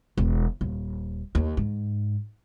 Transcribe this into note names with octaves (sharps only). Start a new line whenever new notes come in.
E1
D#1
D#2
G#2